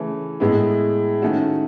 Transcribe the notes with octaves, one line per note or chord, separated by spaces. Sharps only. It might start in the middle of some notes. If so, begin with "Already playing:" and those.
Already playing: C#3 E3 A3 C#4
A2 G#3 B3 E4
D#3 A3 C#4 F#4